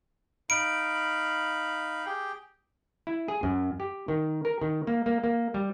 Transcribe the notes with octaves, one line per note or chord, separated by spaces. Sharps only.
D#4 F5 B5 D7
G4 G#4 G5
E4
G#4
F#2
G4
D#3
A#4
D#3
A#3
A#3
A#3
G3